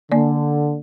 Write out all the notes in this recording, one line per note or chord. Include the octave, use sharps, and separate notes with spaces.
D3 A#3 D5